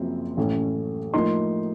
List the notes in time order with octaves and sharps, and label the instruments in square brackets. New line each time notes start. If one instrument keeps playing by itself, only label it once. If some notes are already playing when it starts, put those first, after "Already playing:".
Already playing: [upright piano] F#1 F#2 F3 C4
A1 A2 A3 C#4
A2 F3 A#3 D#4 C6